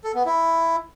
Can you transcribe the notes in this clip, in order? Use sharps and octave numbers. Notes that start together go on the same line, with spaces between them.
A4
B3
E4